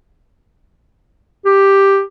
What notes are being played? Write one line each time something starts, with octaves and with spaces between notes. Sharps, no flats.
G4